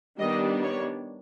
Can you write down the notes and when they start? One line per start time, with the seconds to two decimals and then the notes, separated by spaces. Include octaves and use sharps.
0.18 D#3 G3 B3 D4 D#5
0.62 C#5